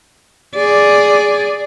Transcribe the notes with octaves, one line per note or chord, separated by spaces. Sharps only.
G#4 D5